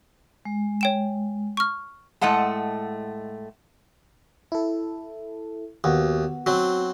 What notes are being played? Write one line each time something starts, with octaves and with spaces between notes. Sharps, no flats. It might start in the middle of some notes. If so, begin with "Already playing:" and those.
G#3
C#5 G5 E7
C#6 F6
A2 G#3 A3 D#5 F#5 A5
E4 A4
D#2 B3 F#4
F#3 C4